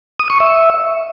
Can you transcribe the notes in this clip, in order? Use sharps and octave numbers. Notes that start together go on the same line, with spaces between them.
D#6
C#6
E5